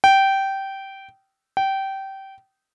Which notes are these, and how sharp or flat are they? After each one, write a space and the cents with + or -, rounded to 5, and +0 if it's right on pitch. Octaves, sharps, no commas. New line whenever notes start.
G5 -15
G5 -20